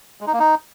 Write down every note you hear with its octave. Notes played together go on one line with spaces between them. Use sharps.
G#3
D#4
A#3
D#4